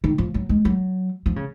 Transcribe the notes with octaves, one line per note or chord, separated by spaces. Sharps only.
D#3
F3
F#3
G#3
F#3
F3
C#3